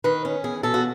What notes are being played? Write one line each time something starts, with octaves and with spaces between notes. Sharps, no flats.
D#3 B4
C#4
E2 G#4
B2 A4
F#4